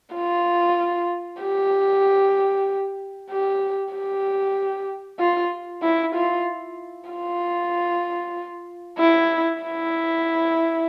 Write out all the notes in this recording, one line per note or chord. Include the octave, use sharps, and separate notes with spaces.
F4
G4
G4
G4
F4
E4
F4
F4
E4
E4